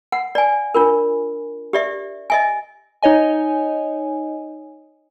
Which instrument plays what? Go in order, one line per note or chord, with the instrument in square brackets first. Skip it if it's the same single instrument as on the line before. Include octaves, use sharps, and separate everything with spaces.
[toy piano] F#5
D5 G#5
D4 F4 A#4
G4 D5 E5
D#5 E5 G#5
[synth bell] D#4 C#5 D#5 G#5